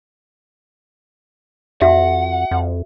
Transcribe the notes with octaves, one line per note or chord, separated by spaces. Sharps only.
F2 F#4 E5 F#5
F2